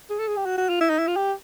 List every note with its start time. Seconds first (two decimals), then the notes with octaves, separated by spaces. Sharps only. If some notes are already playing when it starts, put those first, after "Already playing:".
0.10 G#4
0.19 A4
0.28 G#4
0.37 G4
0.46 F#4
0.57 F#4
0.69 F4
0.81 E4
0.90 D#4
0.99 E4
1.08 F4
1.16 G4